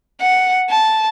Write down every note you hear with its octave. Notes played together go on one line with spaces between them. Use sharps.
F#5
A5